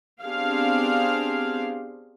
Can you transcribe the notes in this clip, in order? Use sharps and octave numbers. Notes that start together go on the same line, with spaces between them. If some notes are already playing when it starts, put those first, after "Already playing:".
B3 C4 D4 G4 G#4 F5